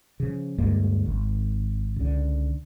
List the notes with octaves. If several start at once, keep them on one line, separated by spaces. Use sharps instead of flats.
C#3 F3
D2 G2 G#3 A#3
G#1
C#2 D3